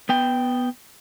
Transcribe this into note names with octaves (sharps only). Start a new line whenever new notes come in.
B3 G5